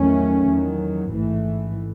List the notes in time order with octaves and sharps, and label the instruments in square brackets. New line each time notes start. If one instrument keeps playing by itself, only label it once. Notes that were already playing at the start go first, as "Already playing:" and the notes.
Already playing: [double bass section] E2 D#3 F#3 A3 C#4
E2 D#3 F#3
A1 G#2 E3 A3